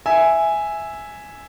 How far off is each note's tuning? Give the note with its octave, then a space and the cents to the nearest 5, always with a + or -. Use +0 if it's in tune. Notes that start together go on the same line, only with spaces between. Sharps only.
E5 +0 G#5 +0